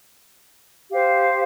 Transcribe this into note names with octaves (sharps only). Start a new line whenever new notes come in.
G4 C5 F5